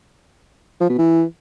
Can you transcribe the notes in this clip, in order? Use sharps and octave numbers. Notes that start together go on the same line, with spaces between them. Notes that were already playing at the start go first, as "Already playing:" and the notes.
F3
B2
E3